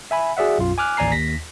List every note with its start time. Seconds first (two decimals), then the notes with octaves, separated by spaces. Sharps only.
0.11 E5 G#5 B5
0.37 F#4 G#4 D5 E5 F#5
0.58 B1 F#2 F4
0.78 G#5 D6 F6 F#6
0.97 A1 D#2 D5 G#5 A#5 C7
1.12 D#2 A#6 B6